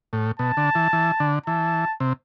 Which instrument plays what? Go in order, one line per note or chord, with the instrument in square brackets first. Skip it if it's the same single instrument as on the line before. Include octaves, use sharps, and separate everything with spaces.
[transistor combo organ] A2
[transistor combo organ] B2 [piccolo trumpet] A5
[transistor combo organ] D3
E3
E3
D3
[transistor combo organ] E3 [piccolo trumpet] A5
[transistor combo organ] C3